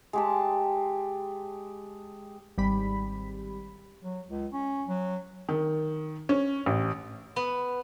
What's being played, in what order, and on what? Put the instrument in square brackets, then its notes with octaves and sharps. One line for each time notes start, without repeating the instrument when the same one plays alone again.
[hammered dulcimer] G#3 G4 A5
[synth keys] G#1 G3 B5
[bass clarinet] F#3
C#2
C#4
F#3
[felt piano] D#3
C#4
A1
[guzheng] B3